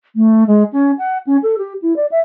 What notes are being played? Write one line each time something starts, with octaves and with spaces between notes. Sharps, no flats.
A3
G#3
C#4
F#5
C#4
A4
G4
E4
D5
E5